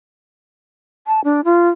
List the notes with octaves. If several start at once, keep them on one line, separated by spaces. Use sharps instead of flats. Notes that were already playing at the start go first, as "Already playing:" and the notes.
A5
D4
F4